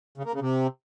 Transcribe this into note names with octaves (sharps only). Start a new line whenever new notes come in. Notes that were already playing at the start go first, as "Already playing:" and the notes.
C#3
A#3
C#3
C3